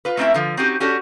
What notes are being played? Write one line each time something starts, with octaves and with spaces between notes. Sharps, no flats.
F4 B4
A3 A#3 C4 C#4 E4 E5
D3 F3
C4 C#4 D#4 F#4 G4
C#4 D4 F#4 G4 A4